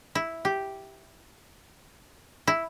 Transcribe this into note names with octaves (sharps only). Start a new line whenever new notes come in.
E4
G4
E4